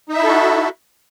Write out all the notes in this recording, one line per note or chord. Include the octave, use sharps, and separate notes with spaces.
D#4 E4 F#4 A4 E5